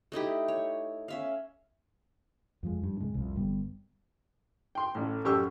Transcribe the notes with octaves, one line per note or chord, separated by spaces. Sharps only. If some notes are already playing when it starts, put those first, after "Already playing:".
A3 D#4 E4 G4
C#5
C#4 E5 F5
F2 F3 G#3
G2
A1 C3 G#3
C2 F2
G1 G2 G3 B3
G5 C6
A1 A2
A1 F#2 G4 C#6 E6